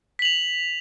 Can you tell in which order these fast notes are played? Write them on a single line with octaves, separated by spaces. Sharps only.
B6 F#7 F7